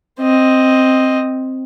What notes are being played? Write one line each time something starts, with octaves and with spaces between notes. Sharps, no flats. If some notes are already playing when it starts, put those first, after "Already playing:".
C4 D#5